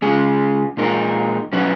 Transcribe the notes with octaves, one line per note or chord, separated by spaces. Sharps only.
C#3 G#3 C#4 G#4
A#2 G#3 D#4 A#4
B2 F#3 C#4 E4 B4